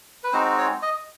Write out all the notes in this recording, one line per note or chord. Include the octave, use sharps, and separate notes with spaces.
B4
G#3 C4 D#4 F#4 C5
C#5
D#5